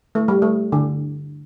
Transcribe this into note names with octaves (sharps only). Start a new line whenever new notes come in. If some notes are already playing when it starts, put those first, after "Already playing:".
A3
G3
A3
D3